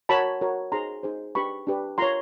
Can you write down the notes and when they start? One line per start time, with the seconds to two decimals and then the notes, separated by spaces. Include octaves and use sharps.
0.09 F#4 A#4 C#5 A5 B5
0.41 F#4 A#4 C#5
0.72 D#4 G#4 C5 A#5 C6
1.03 D#4 G#4 C5
1.35 D4 G4 B4 B5 C#6
1.67 D4 G4 B4
1.98 F4 A#4 C#5 A#5 C6